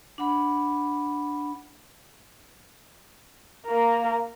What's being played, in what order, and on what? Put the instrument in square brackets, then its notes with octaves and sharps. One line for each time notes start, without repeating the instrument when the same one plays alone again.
[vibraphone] D4 F#5 B5
[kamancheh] A#3 A#4